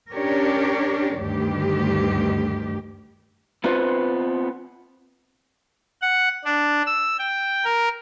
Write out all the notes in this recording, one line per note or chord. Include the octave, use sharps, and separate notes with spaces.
C#4 D4 G4 A#4 C#5 D5
D2 G2 D#3 G4
B3 C4 F4 B4 C5
F#5
D4
E6
G5
A#4